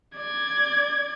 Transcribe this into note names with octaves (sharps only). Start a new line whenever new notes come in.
D5 G#6